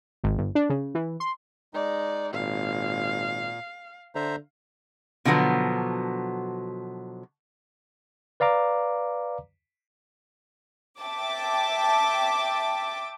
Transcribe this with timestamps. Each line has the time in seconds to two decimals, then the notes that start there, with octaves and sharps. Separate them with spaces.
0.24 G#1
0.38 G1
0.55 D4
0.70 C#3
0.95 E3
1.20 C6
1.74 G#3 D#4 D5
2.33 G#1 A#2 F5
4.15 D3 C5 E5 A#5
5.25 B2 D3 F3 F#3 B3
8.40 B4 D5 F5 A#5 D6
11.01 E5 G5 A5 D6